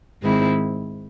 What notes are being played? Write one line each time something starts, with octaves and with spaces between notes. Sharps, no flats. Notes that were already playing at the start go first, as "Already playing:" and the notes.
G#2 D#3 G#3 C4 E4